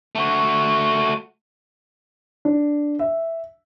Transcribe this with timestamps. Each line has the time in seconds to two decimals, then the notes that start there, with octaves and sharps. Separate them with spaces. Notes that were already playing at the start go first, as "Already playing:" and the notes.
0.15 A3 F#4
2.45 D4
2.99 E5